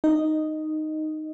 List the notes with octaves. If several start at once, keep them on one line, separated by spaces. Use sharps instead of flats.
D#4 D#5